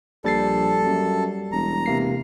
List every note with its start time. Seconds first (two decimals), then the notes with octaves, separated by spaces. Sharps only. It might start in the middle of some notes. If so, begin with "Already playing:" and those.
0.24 A#1 G3 A4 A6 C7
0.85 F#2
1.52 E1 A#5
1.86 C3 A#3 C7